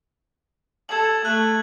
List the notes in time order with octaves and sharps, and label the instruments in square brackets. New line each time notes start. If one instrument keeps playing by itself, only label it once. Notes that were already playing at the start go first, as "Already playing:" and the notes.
[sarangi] A4 [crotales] G#6 F#7
[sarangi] A3 [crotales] F#6 F#7